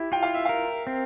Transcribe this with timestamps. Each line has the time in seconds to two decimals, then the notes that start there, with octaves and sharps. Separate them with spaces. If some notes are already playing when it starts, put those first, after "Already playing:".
Already playing: E4 G4
0.12 F4 G5
0.22 F5
0.34 E5
0.45 A#4 F5
0.87 C4